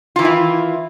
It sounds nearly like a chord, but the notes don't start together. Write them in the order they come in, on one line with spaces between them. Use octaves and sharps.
F4 E3 D#3 E4